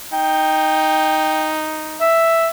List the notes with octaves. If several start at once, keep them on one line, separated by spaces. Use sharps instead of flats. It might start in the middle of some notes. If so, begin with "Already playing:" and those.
D#4 G5
E5